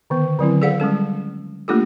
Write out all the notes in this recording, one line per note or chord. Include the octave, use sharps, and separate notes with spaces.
D3 D#3 B3
D3 F#3 C4 E4
G#4 A4 C5 D5 F5 F#5
G3 G#3 C#4 A4
A3 A#3 D4 F4 G4 A4